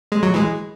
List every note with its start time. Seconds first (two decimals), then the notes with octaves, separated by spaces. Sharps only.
0.12 G#3
0.23 F#3
0.34 E3 G#3